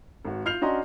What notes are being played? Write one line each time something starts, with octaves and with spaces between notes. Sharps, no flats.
G#1 F#4
F4 F6 G6 C7 F7
C#4 D4 F#4 D#5 A#5 C6